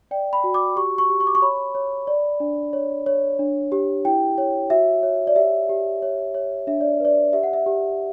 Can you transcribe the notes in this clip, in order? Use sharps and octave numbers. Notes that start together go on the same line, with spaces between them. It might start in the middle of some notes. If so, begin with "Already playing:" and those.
D5 G5
B5
F#4
D6
G4 C#6
C#6
G4
C#6
D6
C#6
C#5 B5
C#5
D5
D4
C#5
C#5
D4
G4
E4 G5
C#5
F#4 E5
C#5
D5
G4 E5
G4
C#5
C#5
D4 E5
D5
B4 D5
G4 E5
F#5
E5
G4